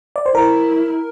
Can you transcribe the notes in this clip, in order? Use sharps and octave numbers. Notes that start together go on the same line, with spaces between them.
D5
C5
E4 A#4